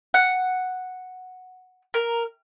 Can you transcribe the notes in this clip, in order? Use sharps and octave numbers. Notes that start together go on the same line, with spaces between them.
F#5
A#4